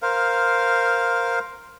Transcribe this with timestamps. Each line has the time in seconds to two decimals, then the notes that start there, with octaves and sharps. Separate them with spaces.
0.02 A#4 C5 F5